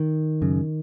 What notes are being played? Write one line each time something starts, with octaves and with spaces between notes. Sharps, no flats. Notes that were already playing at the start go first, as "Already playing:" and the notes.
Already playing: D#3
F#2 C#3